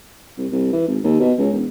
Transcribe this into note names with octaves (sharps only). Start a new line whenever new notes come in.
C2
C2
E3
G#1
D#2
B2
C#2
E1